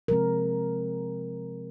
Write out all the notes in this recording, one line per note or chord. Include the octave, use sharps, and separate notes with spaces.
C3 F3 G#3 C4 A#4